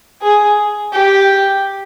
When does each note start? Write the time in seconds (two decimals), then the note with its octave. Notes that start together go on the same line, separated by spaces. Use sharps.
0.22 G#4
0.93 G4